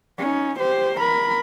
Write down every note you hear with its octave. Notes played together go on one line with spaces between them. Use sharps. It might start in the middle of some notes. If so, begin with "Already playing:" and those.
C#4 D#4
G4 C5
A#4 B5